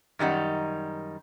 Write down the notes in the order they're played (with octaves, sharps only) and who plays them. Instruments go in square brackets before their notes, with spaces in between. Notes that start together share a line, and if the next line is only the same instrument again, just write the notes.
[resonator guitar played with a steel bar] F#2 D#3 G3 D#4 F#5